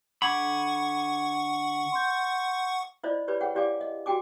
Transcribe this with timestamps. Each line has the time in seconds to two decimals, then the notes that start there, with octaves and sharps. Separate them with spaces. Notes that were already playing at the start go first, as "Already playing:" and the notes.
0.22 D3 F#5 B5 C#6 D6 G#6 C#7
1.92 C6 G6
3.03 E4 F4 C5 D5 D#5
3.28 G4 B4 C#5 D5 B5
3.41 G#4 C#5 F#5 G5
3.55 E4 G4 D5 F5 G#5 D6
3.81 D#5
4.06 F#4 G4 G5 G#5 D6